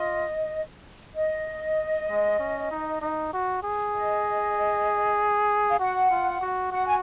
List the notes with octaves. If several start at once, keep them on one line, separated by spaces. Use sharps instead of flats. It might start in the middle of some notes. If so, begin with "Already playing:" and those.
Already playing: F4 D#5
D#5
G#3
C#4
D#4
D#4
F#4
G#4
D#5
F5
F#4 F#5
F4
F#4
F#4 F#5
G#5